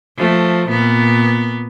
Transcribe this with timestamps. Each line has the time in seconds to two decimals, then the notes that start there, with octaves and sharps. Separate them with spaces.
0.17 F3 A3
0.69 A#2 B3